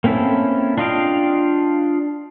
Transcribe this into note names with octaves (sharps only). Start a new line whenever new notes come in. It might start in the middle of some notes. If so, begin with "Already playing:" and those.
A#3 C4 C#4 E4 A4
D4 F4 D#5 F5 G5